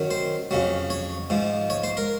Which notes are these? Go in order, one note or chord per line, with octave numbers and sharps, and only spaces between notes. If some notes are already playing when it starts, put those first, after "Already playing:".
Already playing: F#2 D#3 F#3
C5
F2 C#3 F#3
C#5
G#2 F3
C#5
C5
A#4